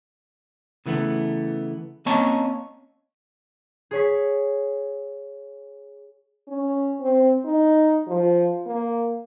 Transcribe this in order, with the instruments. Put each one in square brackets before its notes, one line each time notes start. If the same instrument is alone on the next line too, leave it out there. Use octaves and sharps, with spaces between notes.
[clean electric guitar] C#3 E3 A3 B3
A#3 C4 C#4 C#5 D#5 A5
[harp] G#4 C#5 B6
[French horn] C#4
C4
D#4
F3
A#3